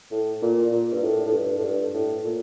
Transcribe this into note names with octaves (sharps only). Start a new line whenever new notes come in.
A2
A#2
A#2
G2
A2
A2
G2
A2
G2
A2
A#2